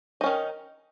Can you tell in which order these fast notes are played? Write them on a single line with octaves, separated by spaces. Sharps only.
D#4 C#4 D#3